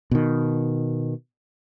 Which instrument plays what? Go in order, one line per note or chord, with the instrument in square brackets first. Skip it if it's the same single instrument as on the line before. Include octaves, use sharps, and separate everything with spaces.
[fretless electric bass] B2 D#3